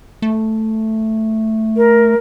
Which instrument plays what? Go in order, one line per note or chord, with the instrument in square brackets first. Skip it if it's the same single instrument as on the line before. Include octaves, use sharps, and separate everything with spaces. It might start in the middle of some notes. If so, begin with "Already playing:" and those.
[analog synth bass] A3
[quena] A#4